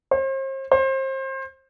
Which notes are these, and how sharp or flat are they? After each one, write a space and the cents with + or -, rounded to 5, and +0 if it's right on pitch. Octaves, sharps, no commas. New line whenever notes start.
C5 +40
C5 +30